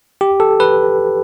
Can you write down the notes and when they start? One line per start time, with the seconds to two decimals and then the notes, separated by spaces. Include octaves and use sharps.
0.21 G4
0.40 A4
0.60 B4